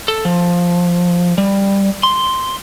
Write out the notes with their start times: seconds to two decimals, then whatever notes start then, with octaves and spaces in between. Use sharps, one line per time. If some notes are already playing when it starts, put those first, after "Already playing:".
0.08 A4
0.25 F3
1.38 G3
2.03 C6